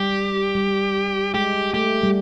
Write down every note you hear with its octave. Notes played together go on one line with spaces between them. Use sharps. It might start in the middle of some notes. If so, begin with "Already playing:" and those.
Already playing: G3 G4
G3
G#3 G4
A3 G4
G3